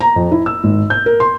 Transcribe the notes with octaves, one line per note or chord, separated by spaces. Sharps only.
A#5
F2
E4
E6
G#1
G6
A#4
C6